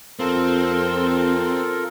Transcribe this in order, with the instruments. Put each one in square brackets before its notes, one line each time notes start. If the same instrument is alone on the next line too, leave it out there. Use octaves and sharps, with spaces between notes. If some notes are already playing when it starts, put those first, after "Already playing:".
[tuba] F2 [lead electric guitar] C4 [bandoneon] F4 A4 A#4